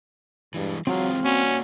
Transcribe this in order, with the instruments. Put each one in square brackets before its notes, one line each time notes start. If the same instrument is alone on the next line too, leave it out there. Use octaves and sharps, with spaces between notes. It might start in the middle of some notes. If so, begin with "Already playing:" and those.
[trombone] G2 [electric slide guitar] E3 G#3
[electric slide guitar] E3 G#3 F4 [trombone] F#3 [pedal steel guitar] C4 F5
[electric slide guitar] A#3 C#5 D5 [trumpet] C#4 [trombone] F#4